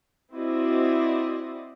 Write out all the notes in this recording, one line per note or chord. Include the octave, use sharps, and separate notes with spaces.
C4 E4 F#4 C5 D5 D#5